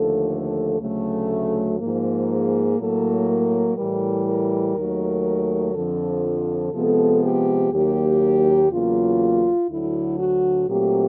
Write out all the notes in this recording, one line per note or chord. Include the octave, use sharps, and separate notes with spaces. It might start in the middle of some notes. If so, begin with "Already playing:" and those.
Already playing: D#2 D3 F3 A3 A4
A4
D2 C#3 F#3 A3
G#2 F3 A#3
G#4
A2 F#3 A#3 A4
A#4
A2 E3 G3 A#4
A#4
D#2 D#3 F#3 A3
F2 D3 F3 A4
C3 F3 G#3 B3 A4
G4
D#2 D#3 F#3 A#3 G4
E2 C#3 F#3 A#3 F4
D2 D3 F#3 E4
F#4
A#2 F#3 A3 C4 G4